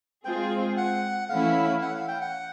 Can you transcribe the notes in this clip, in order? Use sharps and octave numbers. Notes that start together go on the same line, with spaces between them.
G#3 C4 F4 G#4 C5 G5
F#5
E3 A3 C#4 E4 F5
F#5
F5
G5
F#5